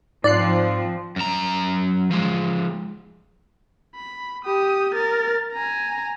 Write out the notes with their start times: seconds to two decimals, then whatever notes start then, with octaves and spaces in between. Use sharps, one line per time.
0.24 G#2 F3 C4 D5 F#6 C7
1.16 F#2 A#5
2.11 F3 G#3
3.95 B5
4.44 G4 D#6
4.94 A#4 A6
5.53 G#5 A#5